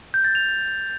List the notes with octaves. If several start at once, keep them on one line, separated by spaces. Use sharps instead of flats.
G6
A6
F7